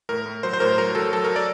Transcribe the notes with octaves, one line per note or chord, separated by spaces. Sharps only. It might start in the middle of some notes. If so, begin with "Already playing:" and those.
A2 A#4
A2
F#3 C5
C5
A2 A#4
F#3 A#4
F#3 A4
F#3 A4
A#4
D5